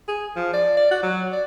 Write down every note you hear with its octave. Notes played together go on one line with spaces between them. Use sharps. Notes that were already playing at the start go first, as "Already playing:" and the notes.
G#4
F3
D5
D5
F#4
F#3
D5